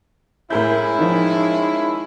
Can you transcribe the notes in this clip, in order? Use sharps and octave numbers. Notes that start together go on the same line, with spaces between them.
A2 G#3 C#4 E4 A#4 G6
D#3 F3